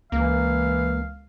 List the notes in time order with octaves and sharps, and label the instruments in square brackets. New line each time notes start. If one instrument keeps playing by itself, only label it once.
[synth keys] C#2 [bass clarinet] E3 [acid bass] A#3 [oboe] F5